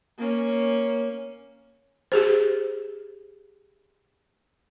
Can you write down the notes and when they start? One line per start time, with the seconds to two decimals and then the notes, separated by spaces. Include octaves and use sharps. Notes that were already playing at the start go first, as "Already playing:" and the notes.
0.18 A#3 C#4
2.12 G4 G#4 C5